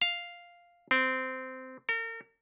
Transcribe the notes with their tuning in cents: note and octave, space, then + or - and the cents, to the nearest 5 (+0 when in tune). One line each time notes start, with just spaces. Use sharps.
F5 +0
C4 -15
A#4 -40